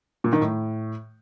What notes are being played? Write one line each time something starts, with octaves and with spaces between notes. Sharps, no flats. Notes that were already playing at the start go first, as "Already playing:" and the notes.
A#2
D#3
A2